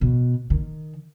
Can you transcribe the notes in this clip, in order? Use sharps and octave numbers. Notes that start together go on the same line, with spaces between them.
B2
D#3